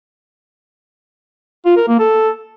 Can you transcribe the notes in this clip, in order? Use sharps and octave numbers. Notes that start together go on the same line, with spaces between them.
F4
A#4
A#3
A4